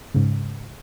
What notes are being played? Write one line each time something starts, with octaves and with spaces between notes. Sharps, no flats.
G#2 C#3